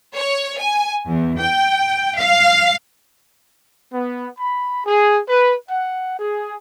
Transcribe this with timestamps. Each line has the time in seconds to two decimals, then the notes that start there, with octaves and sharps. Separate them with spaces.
0.15 C#5
0.58 G#5
1.07 E2
1.37 G5
2.18 F5
3.93 B3
4.39 B5
4.85 G#4
5.28 B4
5.69 F#5
6.19 G#4